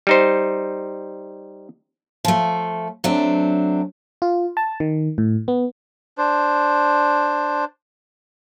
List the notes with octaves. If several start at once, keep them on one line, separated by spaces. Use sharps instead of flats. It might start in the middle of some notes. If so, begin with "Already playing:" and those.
G3 D#4 C5
F3 A3
F#3 A3 C4 D4
F4
A5
D#3
A2
B3
D4 C5